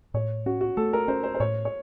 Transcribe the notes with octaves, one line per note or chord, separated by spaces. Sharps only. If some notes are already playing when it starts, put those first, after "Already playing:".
A2 C#5
C#4 F#4
F#4
A3 A4
A#4
C#4 C5
C5
C5
A2 C#5
C#5